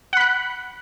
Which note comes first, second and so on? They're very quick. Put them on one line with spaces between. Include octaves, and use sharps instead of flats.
F#5 B5 F#6